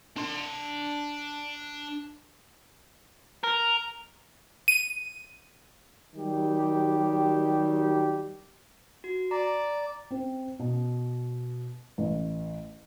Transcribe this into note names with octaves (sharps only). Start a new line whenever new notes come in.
D4 C6
A#4
D#7
D#3 F#3 G3 G4
F#4
D5 A#5
C4
B2
A1